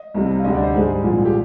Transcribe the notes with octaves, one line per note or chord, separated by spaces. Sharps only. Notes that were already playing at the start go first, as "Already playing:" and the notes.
Already playing: D#5
C2 C3 G3
F5
D2 D3 G3 D#5
D5
C5
G#2 G3 G#4
C2 A#2 F3 G#3
G4